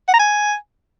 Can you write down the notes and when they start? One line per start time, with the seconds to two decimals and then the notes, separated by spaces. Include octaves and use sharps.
0.08 F#5
0.14 A#5
0.19 G#5